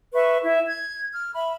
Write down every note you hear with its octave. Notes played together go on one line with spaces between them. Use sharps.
B4 E5 C#6
E4 E5
G#6
F6
E5 B5